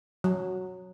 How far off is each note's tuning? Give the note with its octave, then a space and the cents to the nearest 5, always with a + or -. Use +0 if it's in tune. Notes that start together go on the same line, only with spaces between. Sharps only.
F#3 -5